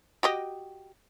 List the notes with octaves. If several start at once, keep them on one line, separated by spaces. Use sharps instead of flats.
F#4 G4 D#5